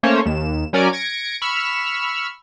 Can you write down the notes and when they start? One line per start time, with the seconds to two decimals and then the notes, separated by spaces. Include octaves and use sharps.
0.03 A3 A#3 C#4 C5 C#5
0.26 D#2 E7
0.73 F#3 C#4 A#4 D5 G#5 D7
0.93 G#6 A#6 C#7 D7
1.42 B5 C#6 E6 F6